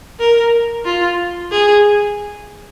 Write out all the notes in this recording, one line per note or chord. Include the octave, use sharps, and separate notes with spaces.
A#4
F4
G#4